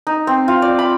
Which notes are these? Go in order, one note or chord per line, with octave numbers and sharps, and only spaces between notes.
D#4
C4
F4
D5
B5